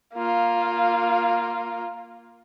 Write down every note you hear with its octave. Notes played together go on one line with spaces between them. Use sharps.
A#3 F4